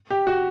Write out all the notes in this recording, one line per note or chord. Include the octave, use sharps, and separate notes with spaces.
G4
F#4